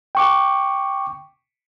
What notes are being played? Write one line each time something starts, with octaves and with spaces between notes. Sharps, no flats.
G5 C#6 D6